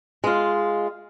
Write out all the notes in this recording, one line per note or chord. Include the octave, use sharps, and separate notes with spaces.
G#3 F4